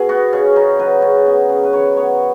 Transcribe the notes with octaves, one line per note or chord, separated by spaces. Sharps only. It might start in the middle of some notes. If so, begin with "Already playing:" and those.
Already playing: B2 G#4
B3 F#4
C#3 C#4
C#3 D#4
F#3 B4
C#3
B3
C#3
B4
D#3 C#5
B3 C#5